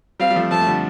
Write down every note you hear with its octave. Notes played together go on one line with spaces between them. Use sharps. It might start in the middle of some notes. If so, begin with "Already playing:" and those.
G3 C4 F5
G3
F3 A3
F3 A3 A5
A3
D3 G3